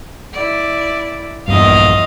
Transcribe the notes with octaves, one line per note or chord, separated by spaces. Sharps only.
E4 D5
A#1 E2 G2 D#5 F5